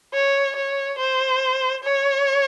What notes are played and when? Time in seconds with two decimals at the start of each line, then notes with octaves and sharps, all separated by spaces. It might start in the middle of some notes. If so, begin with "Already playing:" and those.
0.14 C#5
0.56 C#5
0.99 C5
1.84 C#5